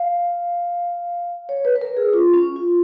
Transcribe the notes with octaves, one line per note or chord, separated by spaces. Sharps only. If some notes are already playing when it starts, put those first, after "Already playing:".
Already playing: F5
C#5
B4
B4
A#4
G#4
F4
C#4
F4